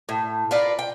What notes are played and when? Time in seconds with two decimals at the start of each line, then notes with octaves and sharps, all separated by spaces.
0.09 A2
0.51 F4 A#4 B4 D5
0.79 G5